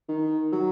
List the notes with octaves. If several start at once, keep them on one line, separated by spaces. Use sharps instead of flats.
D#3
F#3